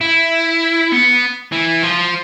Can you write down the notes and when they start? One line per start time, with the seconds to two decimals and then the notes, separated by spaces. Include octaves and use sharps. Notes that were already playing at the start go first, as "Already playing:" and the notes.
0.01 E4
0.92 B3
1.52 E3
1.83 F3